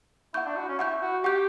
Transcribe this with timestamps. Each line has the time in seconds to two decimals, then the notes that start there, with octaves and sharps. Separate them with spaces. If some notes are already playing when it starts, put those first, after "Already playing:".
0.34 E4 F#5 C#6 G6
0.46 D4
0.56 F#4
0.68 C#4
0.78 E4 F#5 C#6 G6
1.02 F#4
1.23 G4 F#5 C#6 G6